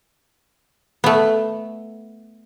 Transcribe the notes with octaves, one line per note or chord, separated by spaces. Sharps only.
A3 B3